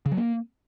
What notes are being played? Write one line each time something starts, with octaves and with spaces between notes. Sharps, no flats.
C#3
F#3
A#3